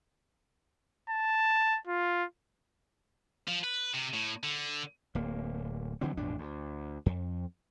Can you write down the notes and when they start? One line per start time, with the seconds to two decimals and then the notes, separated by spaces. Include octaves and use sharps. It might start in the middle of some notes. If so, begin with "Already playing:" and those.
1.10 A5
1.87 F4
3.48 F3
3.64 B4
3.94 C3
4.14 A2
4.43 D3
5.15 D1 A#3
6.01 D3 E3 F#3 C4
6.17 A1 F2 B2 D4
6.38 D2
7.06 F2